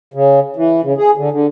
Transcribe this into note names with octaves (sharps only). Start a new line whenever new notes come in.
C#3
E3
C#3
G#4
D3
D3